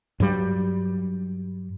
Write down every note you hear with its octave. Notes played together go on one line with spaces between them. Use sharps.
G2 F#3 G3